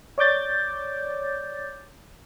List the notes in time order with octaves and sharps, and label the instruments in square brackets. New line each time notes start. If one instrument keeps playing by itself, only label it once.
[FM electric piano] C#5 D5 D6 G6 A6